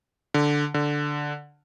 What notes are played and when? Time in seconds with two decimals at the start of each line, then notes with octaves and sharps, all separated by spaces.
0.34 D3
0.74 D3